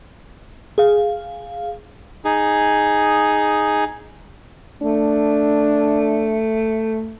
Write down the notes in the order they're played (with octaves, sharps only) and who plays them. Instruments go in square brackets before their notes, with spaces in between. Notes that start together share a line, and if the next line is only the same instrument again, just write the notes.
[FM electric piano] G#4 F5
[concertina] D#4 G#4
[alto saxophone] A3 [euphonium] D4